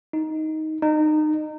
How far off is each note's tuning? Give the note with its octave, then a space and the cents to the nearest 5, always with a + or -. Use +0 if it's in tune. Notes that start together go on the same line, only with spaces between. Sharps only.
D#4 +10
D#4 -25